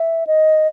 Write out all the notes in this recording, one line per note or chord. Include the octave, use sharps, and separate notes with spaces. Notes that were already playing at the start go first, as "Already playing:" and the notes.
Already playing: E5
D#5